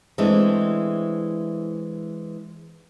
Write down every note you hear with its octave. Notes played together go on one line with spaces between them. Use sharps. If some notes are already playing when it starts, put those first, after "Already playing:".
E3 G#3 A3 C4 D4